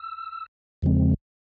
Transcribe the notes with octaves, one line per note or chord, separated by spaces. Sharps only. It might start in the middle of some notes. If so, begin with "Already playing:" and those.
Already playing: E6
E2 C#3 F3 G#3 C4